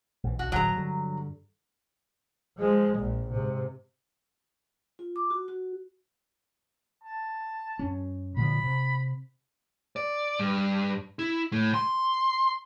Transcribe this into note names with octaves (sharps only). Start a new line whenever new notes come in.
A#1 E3
B1 F#4
D1 G1 C#3 F#3 A#5
G2 D3
F3 G#3
A#1 A#2
G#2 C3
F4
D6
F#4
F#4
A5
F#2 C#4
A#2 D3 F3 B5
C3
D5
G2
E4
A2
C6